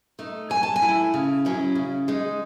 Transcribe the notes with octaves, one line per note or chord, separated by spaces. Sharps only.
A3 D#4
F#3 G#5
A5
G#5
A3 E4
C#3
F#3 C#4 E4
C#3
G#3 D#4